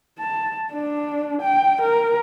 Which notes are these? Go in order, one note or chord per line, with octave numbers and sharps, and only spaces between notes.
A5
D4
G5
A#4